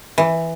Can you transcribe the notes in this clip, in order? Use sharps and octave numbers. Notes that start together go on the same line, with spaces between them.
E3